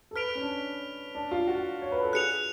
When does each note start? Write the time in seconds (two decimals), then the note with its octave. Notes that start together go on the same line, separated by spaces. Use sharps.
0.11 A4
0.15 B4 F6 B6 D7 F7
0.35 C#4
0.41 D4
1.15 D4
1.31 F4
1.47 F#4
1.82 C#5
1.92 B4
2.03 A4
2.13 G#4 F#6 C#7 F7